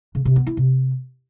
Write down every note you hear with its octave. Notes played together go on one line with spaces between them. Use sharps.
C#3
C3
B3
E4
C3